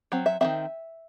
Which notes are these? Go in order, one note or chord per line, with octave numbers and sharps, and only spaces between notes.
F#3 C4
E5
D#3 F#3 C4 E5